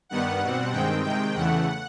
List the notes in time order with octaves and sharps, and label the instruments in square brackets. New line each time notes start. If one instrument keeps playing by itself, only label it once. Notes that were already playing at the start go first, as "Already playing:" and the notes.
[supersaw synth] G2 D#3 G3 B3 F#5
B2 G3 C4
G2 D#3 G#3 C4 G5
C3 D#3 G#3 G5
E2 C#3 E3 A3 F#5